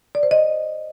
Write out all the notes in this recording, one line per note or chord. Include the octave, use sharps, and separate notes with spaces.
D5
C5
D#5